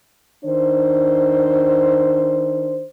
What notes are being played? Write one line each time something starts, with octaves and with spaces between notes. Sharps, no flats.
D#3 D4 C5